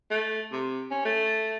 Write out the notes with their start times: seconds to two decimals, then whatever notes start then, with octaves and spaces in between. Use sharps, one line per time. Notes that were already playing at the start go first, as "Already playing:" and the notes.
0.11 A3
0.52 C3
0.90 C#4
1.05 A3